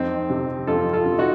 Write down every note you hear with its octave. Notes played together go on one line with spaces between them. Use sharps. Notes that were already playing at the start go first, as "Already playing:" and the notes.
Already playing: F2 C4 D#4
C3
F2 F4 A4
F4 A4
C3
D#4 F#4